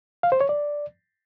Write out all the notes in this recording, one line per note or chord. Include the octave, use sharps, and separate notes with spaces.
F5
C5
C#5
D5